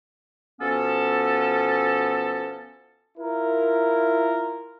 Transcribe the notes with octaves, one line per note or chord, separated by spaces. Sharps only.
B2 F3 B3 C#4 A4
E4 F4 A#4